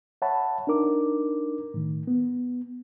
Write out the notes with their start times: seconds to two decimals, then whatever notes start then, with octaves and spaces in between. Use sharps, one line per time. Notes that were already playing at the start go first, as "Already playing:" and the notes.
0.22 C#5 E5 F#5 A5 B5
0.67 D4 D#4 A#4 D6
1.74 A2 D#3
2.07 B3